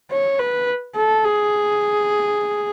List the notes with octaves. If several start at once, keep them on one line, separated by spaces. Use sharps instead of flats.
C#5
B4
A4
G#4